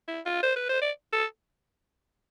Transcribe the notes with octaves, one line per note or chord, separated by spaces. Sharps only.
E4
F4
C5
B4
C5
D5
A4